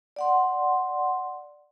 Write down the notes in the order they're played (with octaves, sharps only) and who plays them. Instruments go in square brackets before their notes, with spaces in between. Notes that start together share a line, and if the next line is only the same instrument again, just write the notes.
[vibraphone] D5 F#5 C6